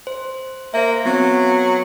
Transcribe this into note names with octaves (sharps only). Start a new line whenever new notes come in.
C5
A#3 C5 E5
F#3 B3 C4